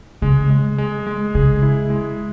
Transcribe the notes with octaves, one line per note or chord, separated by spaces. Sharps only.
C#3 G#3
G#3
G#3
G#3
C#3 G#4
E4
G#3